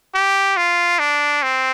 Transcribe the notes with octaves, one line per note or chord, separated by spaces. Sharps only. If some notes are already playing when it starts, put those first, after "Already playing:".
G4
F4
D4
C4